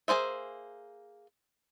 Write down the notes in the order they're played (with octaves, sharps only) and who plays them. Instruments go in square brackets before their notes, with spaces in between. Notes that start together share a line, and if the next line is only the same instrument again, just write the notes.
[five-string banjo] A#3 C#4 G#4 C5 E5